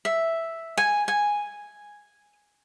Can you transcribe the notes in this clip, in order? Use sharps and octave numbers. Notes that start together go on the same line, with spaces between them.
E5
G#5
G#5